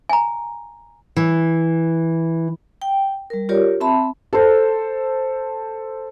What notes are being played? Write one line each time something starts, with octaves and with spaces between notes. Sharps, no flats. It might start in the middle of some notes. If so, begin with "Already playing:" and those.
G#5 A#5
E3
G5
G3 A#4
F4 G4 A#4 C#5 D5
C4 E5 A5 B5
A4 C5